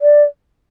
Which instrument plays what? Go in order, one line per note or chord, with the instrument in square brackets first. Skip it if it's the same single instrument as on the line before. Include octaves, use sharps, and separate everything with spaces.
[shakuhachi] D5